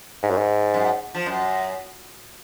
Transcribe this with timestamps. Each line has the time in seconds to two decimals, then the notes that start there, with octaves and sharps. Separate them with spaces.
0.23 G#2
0.30 F#2
0.37 G#2
0.74 F#2
1.15 F3
1.26 F#2